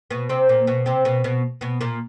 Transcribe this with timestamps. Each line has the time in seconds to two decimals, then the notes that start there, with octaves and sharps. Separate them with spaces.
0.11 B2 B3
0.29 C3 C4
0.49 A#2 A#3
0.67 B2 B3
0.86 C3 C4
1.05 B2 B3
1.24 B2 B3
1.61 B2 B3
1.81 A#2 A#3